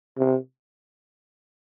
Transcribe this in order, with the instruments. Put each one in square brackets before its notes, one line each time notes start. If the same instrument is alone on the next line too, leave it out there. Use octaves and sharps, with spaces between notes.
[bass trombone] C3